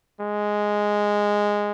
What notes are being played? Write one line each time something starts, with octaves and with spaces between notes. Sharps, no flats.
G#3